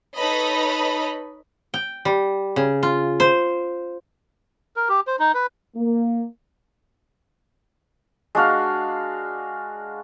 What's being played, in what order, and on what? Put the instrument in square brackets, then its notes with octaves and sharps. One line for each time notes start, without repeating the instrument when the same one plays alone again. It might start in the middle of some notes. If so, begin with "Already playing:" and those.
[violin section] D#4 A4 B4 C#5 D#5 B5
[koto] G5
G3
C#3
F4
C5
[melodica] A#4
G4
C5
D#4
B4
[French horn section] A#3
[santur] G#3 D4 F#4 F5